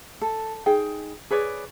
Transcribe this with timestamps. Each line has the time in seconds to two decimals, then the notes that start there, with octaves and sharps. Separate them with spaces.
0.22 A4
0.66 D#4 G#4 G5
1.31 G#4 B4 C#5 D5